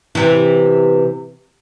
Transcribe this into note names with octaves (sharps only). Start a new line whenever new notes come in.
C3 E3